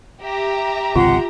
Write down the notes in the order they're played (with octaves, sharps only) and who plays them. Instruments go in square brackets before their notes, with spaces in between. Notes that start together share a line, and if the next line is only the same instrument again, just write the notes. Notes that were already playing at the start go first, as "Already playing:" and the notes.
[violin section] G4 E5 A#5
[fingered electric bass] G#1 C#2 C3 [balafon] F4 [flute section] F#5 C6